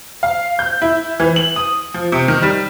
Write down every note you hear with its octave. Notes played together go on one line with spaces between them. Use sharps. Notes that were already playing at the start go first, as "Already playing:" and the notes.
F5
G6
E4
E3
F#7
D#6
F3
C3
D#3
G3